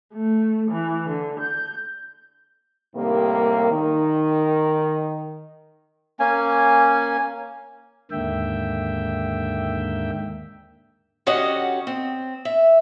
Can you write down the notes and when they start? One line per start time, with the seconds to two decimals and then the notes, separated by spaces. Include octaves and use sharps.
0.13 A3
0.70 E3
1.09 D3
1.39 G6
2.96 A2 C3 D#3 G3 A#3
3.72 D#3
6.20 A#3 C#4 G#5
8.11 D#2 G#2 D3 A#3 E5 G5
11.27 D3 C#4 F#4 G4 D#5 F#5
11.87 C4
12.45 E5